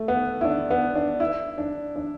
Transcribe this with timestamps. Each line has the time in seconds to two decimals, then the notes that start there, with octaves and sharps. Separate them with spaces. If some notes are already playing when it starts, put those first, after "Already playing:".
Already playing: A3
0.08 B3
0.41 E4
0.45 D4
0.70 B3
0.95 D4
1.20 E4
1.58 D4
1.96 D4